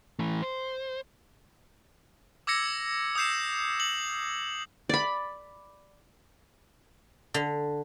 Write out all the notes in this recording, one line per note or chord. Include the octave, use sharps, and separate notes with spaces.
E3 A3
C5
D6 E6 G#6 A#6 C#7
D#6 E6 G6 C7 E7
F#7
D5 B5
D3